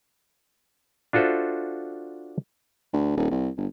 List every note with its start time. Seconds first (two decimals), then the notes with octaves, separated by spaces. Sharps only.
1.13 D4 F4 F#4 A4 C5 E5
2.93 D2
3.17 D#1
3.31 C2
3.57 G1